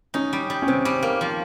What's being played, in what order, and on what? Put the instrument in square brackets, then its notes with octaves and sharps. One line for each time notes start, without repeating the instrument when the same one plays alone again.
[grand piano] C#4 [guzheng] D#4
[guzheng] G3
G3
[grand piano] C#4
[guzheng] C3 [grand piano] C4
[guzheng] G3
A#3
F3